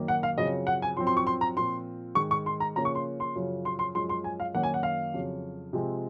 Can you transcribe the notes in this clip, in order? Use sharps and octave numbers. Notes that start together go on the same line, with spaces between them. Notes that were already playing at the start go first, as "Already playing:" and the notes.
Already playing: F#2 D#3 A#3
F#5
F5
F#2 C#3 F3 C4 D#5
F#5
G#5
F#2 F3 C4 C6
C6
C#6
C6
A#5
A#2 F3 C4 C6
G#2 D#3 G#3 C#6
C#6
C6
A#5
C#3 F3 A#3 C#4 A#5
C#6
C6
C6
F#2 C#3 F3
C6
C6
F#2 F3 G#3 C#4 C6
C6
G#5
F5
F#2 D#3 A#3 C#4 F#5
G#5
F#5
F5
F2 C#3 F#3
C3 F3 G#3 C4